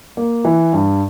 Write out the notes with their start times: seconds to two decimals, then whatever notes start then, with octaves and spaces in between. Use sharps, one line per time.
0.17 A#3
0.45 E3
0.73 G2